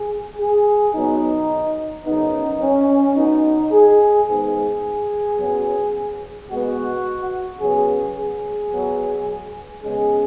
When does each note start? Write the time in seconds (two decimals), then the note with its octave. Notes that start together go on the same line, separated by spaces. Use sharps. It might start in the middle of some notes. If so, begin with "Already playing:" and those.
Already playing: G#4
0.39 G#4
0.94 B2 F#3 B3 D#4
2.06 F#2 C#3 B3 D#4
2.61 C#4
3.16 B2 B3 D#4
3.72 G#4
4.27 G#2 D#3 G#3 B3 G#4
5.38 F#2 F#3 B3
6.50 B2 G#3 B3 F#4
7.60 C#3 F#3 B3 G#4
8.17 G#4
8.71 B2 F#3 B3
9.82 C#3 G#3 B3 G#4